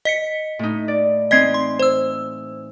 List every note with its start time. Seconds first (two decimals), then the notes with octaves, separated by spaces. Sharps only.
0.05 D#5 B6 C#7
0.59 A2 D#4
0.88 D5
1.31 E3 C4 D#4 D#5 G#6 C7
1.54 C6
1.79 C5 E6